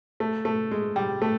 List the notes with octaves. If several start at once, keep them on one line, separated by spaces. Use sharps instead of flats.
A3
A3
G#3
G3
A3